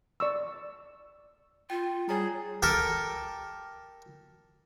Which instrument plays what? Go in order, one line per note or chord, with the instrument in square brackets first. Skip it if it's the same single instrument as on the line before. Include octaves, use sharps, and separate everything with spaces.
[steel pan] D5 C#6 E6
[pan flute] F4 [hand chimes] G5
[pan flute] G3 [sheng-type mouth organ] G#4 [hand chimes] C#5 A#5
[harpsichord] G4 A4 A#4